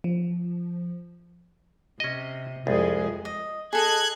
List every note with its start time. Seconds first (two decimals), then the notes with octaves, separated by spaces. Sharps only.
0.04 F3
2.00 C3 C#4 D#5
2.67 C2 F2 G#3 G#4
3.25 D#5
3.73 G#4 A4 D#5 F#6 G#6